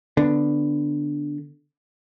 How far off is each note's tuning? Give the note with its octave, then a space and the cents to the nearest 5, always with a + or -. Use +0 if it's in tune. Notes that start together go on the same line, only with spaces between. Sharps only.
D3 +0 B3 +5